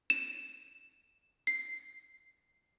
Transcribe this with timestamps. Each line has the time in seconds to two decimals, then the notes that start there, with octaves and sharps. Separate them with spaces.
0.10 E7
1.47 C7